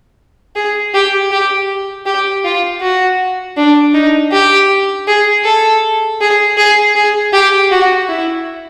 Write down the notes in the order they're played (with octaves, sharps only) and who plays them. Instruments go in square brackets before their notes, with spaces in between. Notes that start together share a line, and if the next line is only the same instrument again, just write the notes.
[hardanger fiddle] G#4
G4
G4
G4
F4
F#4
D4
D#4
G4
G#4
A4
G#4
G#4
G#4
G4
F#4
E4